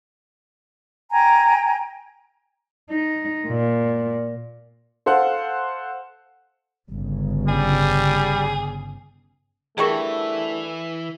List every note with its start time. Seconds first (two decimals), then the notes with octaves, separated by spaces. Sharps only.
1.11 G5 G#5 A#5
2.90 D#4
3.47 A#2
5.06 A4 C5 F5 F#5
6.90 G1 C#3
7.48 G3 G#4
9.78 D3 E3 G3 A3 G#4 A#4 C#6